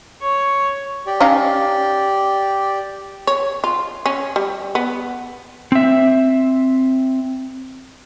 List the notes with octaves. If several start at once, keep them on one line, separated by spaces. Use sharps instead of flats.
C#5
G4 D5
C#4 D#4 F5
C#5
F4
C#4
G3
B3
C4 E5